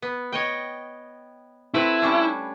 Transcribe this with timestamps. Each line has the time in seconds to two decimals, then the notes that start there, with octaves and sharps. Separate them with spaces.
0.02 B3
0.32 C#5 D#5 G5
1.74 A3 C4 E4 B4
2.02 G3 C#4 D4